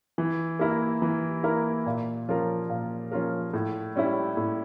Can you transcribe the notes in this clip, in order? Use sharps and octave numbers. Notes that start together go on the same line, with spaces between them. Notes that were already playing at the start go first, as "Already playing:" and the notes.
E3
A#3 E4 A#4
E3
A#3 E4 A#4
A#2
F3 C#4 F4 A#4
A#2
F3 C#4 F4 A#4
A2
G3 C#4 E4
A2